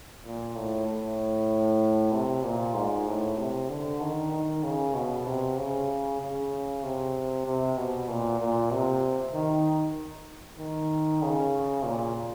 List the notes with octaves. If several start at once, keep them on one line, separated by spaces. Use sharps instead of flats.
A#2
A2
A2
C3
A#2
G#2
A2
C3
D3
D#3
D#3
C#3
B2
C3
C#3
C#3
C3
C3
B2
A#2
A#2
C3
D#3
D#3
C#3
A#2